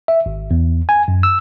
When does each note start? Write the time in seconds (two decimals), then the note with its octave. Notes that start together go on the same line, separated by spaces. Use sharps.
0.08 E5
0.26 G#1
0.51 E2
0.89 G#5
1.08 F#2
1.23 E6